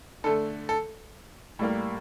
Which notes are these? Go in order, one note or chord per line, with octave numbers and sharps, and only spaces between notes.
D3 A3 A4
A4
A2 G3 A#3